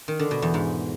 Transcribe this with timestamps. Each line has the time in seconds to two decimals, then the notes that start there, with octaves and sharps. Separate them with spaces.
0.08 D#3
0.19 D3
0.31 B2
0.42 E2
0.54 G#2